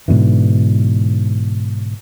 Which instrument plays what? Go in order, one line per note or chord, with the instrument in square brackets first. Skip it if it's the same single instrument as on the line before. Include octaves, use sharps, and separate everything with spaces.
[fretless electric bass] G#2 B2 D3 E3